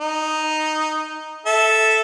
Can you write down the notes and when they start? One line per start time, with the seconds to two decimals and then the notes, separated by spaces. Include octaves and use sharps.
0.01 D#4
1.46 A4 E5